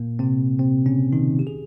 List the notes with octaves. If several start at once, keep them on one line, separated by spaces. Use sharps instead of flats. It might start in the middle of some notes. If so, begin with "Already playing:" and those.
Already playing: A#2 A#3
C3 C4
C3 C4
C#3 C#4
D#3 D#4
G4
G#4